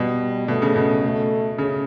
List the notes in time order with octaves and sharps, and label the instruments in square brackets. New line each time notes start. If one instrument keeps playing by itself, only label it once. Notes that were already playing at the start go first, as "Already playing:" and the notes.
Already playing: [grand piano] B2 [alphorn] G3
[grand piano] B2 [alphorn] A3
[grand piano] C#3
B2
[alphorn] A3
[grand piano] C#3